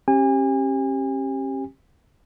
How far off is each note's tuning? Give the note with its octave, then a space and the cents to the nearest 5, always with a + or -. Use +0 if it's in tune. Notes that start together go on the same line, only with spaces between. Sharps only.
C#4 -45 G4 +0 G#5 -35